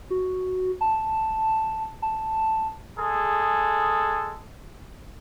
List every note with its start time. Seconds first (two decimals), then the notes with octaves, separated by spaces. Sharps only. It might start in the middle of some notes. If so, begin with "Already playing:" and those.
0.10 F#4
0.81 A5
2.02 A5
2.97 G#3 G#4 A4